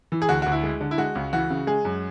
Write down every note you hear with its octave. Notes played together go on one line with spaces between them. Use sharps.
E3
G#4
D2 F#4
D2 F#4
E4
G#3
D3
E4
G#3 F#4
C#2
E3 F#4
C#3
G#3 G#4
F#2